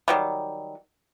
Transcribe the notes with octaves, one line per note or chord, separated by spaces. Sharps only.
D#3 F#3 G3